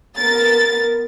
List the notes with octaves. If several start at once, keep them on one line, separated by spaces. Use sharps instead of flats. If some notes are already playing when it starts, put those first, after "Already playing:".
B3 A#4 A6